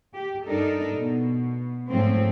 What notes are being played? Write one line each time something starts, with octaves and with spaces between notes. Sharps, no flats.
G4
G2 D4 D#4 A4 A#4
B2
G#2 F3 A3 C4 C#4